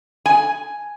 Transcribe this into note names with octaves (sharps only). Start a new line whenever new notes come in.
G#5